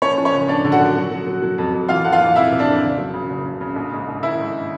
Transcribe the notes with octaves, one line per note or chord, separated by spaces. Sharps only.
F3 C#4 C#5
F3
C#4 C#5
F#1
F3 D4 D5
D3
F#4 F#5
F#2
F#3
F#3
F#3
F#3
F2
F2
E3 F4 F5
F2 F#5
F4 F5
E3
C3 E4 E5
C3
D4 D5
F2
F#1
F#3
C#3
F#1
C#3
C#3
A#1
G#2
A#1
D#3 E4 E5
G#2